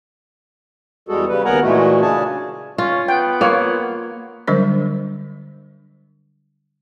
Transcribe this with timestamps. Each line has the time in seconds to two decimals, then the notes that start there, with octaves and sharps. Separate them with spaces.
1.09 E2 G3 G#3 F#4 G#4 A4
1.28 C#3 G3 B4
1.45 D#2 B3 A#4 F#5 G#5 A#5
1.63 A#2 E3 G#3 A3 F#4
2.01 C#3 C#4 D4 G#4 G#5 A5
2.78 C#4 F4
3.08 B3 G5
3.41 A#3 F4 C#5
4.48 D3 F#3 G3 D4 A#4 C5